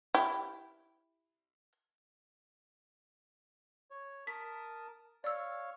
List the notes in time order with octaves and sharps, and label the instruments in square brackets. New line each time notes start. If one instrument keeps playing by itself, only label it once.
[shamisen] E4 G4
[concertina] C#5
[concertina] A#4 A5 D#6 [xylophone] B6
[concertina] C#5 F5 C#6 [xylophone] D5 E6